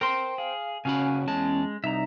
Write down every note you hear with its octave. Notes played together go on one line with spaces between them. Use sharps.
A#4 C5 G5 C6
G#4 F5
C#3 C#4 F#4 F5 G#5 B5
E2 G#3 A5
C2 D#4 E5 A#5